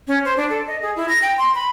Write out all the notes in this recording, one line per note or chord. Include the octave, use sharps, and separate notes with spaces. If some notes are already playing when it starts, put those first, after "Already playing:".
C#4
C5
D4
A4
D#5
G#4
E4
A#6
G5
C6
B5